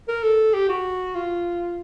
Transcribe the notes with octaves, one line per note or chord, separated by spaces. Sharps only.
A#4
A4
G4
F#4
F4